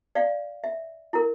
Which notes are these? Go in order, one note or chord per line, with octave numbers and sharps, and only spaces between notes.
D5 F5
E5
E4 A#4